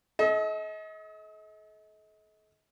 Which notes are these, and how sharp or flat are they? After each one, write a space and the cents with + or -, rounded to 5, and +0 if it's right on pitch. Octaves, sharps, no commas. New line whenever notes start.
A4 -40 D#5 +35